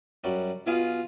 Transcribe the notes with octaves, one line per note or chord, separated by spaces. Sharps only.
F#2 F#3 G3
B2 F4 G#4 F5